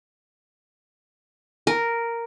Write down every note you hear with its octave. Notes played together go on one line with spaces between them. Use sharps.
A#4